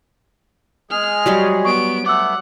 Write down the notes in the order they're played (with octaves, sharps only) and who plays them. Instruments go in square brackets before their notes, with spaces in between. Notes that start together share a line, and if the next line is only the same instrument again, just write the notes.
[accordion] G#3 G#4 [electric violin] F6
[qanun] F#3 G3 D#5
[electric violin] B3 D7 [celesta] C#6
[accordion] A3 B3 [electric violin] F#5 [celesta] D6 E6